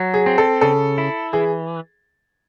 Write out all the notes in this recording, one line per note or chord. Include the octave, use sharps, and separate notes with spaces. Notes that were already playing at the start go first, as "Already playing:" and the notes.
Already playing: F#3
G#4
C4
A4
C#3 A4
E4
E3 G#4